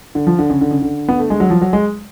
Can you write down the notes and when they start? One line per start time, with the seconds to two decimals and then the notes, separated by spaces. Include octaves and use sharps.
0.15 D3
0.27 F3
0.39 D3
0.50 C#3
0.61 D3
0.71 C#3
0.82 D3
1.08 B3
1.19 A3
1.30 G#3
1.40 F#3
1.50 F3
1.61 F#3
1.73 G#3